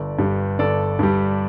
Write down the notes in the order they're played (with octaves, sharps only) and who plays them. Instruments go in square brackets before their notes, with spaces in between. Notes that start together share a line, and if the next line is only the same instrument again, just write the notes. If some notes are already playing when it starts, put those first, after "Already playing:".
Already playing: [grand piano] G1 A4 D5
G2 G3
G1 A4 D5
G2 G3